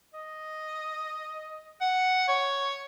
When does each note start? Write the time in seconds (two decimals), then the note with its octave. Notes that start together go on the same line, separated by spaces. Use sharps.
0.14 D#5
1.81 F#5
2.28 C#5